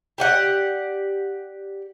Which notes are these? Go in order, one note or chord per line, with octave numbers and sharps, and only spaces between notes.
G4 D5 F#5